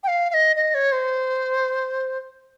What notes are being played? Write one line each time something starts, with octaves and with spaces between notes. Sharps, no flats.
G5
F5
F5
D#5
D#5
C#5
C5